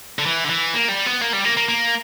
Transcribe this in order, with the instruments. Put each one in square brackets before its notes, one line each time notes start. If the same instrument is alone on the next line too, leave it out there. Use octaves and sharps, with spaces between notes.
[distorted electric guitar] D3
E3
D3
E3
A#3
G3
B3
A#3
G3
A#3
A#3
A#3